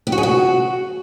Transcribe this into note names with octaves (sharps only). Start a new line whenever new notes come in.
G4
F#4
G#4
F#4